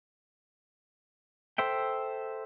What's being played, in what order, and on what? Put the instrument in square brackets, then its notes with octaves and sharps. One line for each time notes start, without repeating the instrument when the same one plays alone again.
[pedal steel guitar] A4 C5 E5 G5